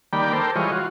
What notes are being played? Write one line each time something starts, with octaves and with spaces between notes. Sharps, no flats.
D#3 G3 A#3 D5 G5 B5
A4 A#4 C5 G5
E3 G3 G#3 F4 C#5 D#5
F4 F#4